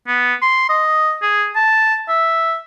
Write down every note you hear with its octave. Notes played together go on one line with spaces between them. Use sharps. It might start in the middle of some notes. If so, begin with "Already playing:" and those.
B3
C6
D#5
G#4
A5
E5